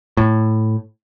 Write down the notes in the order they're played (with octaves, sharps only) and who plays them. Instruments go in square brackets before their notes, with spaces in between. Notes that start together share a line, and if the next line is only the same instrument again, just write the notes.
[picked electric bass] A2